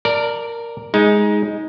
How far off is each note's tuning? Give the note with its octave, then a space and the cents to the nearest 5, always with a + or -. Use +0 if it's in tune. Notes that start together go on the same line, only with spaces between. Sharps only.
A#4 +0 D5 +0 A5 +30
G#3 +0 D#4 +20